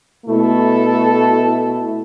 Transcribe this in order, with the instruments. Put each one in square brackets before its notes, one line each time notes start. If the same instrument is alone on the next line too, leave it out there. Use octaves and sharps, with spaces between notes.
[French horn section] B2 A3 E4 A4